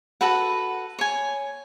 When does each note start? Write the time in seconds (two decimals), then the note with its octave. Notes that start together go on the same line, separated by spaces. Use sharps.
0.21 F#4 A4 B4 F#5
0.99 C#5 G#5